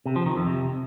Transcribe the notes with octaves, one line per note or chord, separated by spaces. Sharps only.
C3
F3
D#3
F2
C3